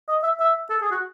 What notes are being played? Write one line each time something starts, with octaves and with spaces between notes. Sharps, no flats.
D#5
E5
E5
A4
G#4
F#4